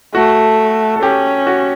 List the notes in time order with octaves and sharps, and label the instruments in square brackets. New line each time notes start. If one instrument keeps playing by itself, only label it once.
[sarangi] A3 [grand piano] F#4
[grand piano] A4
[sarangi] C#4 [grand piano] G4
[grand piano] F#4